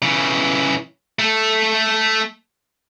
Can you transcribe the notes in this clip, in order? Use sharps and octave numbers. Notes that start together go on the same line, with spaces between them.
C#3 E3
A3 A4